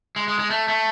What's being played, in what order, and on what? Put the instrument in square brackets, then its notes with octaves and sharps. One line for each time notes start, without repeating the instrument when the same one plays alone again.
[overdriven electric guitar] G#3
G#3
G#3
A3
A3